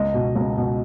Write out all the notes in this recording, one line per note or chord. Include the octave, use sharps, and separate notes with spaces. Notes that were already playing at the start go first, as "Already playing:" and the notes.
Already playing: C#2 D#5
B2
C#2
B2